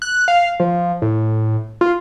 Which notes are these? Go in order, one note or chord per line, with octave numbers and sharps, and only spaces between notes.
F#6
F5
F3
A2
F4